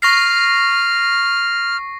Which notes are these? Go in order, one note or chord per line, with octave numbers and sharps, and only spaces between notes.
C#6 F6 A#6 C7